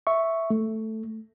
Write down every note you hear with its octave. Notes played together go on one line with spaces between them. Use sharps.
E5 C#6
A3